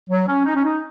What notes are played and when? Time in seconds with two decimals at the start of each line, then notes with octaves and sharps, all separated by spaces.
0.10 F#3
0.28 C#4
0.46 D#4
0.55 C#4
0.64 D#4